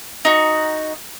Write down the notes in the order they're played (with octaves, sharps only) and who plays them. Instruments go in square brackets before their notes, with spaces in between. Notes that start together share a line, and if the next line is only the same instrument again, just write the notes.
[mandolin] D#4 F#4